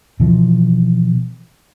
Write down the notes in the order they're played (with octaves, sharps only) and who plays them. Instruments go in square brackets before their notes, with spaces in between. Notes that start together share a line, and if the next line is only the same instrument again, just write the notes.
[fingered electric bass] B2 E3 F3